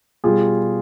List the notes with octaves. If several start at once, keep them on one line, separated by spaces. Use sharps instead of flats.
B2 G3 F4 G#4